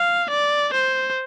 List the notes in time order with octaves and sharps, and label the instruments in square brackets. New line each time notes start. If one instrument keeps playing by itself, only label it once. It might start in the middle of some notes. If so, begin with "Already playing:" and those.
Already playing: [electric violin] F5
D5
C5